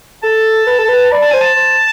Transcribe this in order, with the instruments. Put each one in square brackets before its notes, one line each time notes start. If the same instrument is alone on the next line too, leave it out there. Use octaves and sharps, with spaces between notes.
[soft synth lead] A4 [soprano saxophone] A5
[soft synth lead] B4
A4
B4
[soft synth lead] D5 [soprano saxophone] B5
[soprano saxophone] A5
[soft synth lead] C5 [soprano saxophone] G#5
[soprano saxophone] A5
[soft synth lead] C5